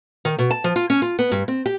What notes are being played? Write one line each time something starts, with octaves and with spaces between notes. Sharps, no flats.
D#3
B2
A5
F3
F4
C#4
F4
B3
G2
C4
G4